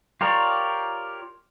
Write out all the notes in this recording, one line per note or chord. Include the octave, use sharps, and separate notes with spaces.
F4 G4 A#4 C#5 D5